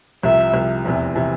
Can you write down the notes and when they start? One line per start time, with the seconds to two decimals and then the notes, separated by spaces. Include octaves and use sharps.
0.23 C2 C3 F3 E5
0.54 C2 C3 F3
0.85 F1 E2 C3 E3
1.15 C3 E3